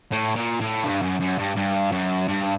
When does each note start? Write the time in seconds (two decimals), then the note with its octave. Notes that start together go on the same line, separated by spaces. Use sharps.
0.12 A2
0.36 A#2
0.60 A2
0.84 G2
1.02 F#2
1.20 F#2
1.38 G2
1.56 G2
1.92 F#2
2.28 G2